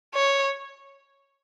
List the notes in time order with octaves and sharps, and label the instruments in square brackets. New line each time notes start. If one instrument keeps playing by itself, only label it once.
[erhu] C#5